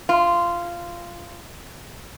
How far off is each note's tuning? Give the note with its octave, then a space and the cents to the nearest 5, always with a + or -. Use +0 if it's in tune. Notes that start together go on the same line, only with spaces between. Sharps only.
F4 -15